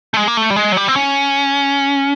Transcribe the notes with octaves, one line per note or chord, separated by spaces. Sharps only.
A3
G#3
A#3
A3
G3
G#3
F#3
G3
C4
C#4